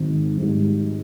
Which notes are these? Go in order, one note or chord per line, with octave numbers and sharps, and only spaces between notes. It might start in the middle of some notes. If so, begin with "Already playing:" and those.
Already playing: G#1 G#2
G#2 G3